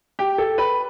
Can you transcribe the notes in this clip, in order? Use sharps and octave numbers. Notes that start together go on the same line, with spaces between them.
G4
A4
B4